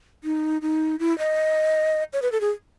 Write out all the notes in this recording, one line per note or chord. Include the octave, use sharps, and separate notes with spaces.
D#4
D#4
E4
D#5
C#5
B4
A4
G#4